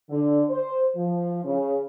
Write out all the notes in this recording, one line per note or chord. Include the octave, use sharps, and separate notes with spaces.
D3
C5
F3
C#3